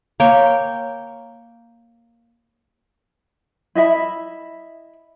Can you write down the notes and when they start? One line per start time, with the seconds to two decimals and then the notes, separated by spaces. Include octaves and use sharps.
0.20 A#3 C#5 G5
3.75 E4 D#5 E5 B5